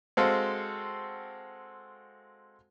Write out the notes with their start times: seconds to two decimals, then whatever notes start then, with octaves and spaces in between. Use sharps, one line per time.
0.17 G#3 C4 F#4 A4 C5 F5